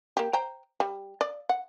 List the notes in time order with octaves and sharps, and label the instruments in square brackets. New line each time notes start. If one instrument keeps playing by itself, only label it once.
[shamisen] A#3 G4
C5 G5 A#5
G3
D5
F#5